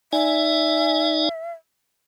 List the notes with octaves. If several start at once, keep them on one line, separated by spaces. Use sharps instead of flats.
D#4 D5 E5 G#5